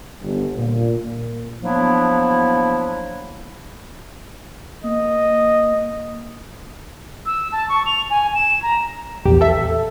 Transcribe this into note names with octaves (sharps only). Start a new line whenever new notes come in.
G1
A#2
F3 F#3 A#3 B3 D4 E4
A#3 D#5
E6
A5
C#6
F7
G#5
E7
A#5
A#1 E2 G4
A4 E5